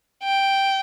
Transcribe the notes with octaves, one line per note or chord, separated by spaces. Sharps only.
G5